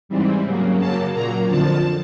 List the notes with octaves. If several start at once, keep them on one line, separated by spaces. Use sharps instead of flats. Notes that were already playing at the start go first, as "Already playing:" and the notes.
G#2 E3 G3 C4
C#3 F#3 A#3
F#2 C#3 F#3 A#3 A5
A#2 F#3 A#3 A#5
F2 D3 F3 A5